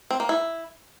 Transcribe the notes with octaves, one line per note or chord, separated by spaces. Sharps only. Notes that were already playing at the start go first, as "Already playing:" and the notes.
C4
A#3
E4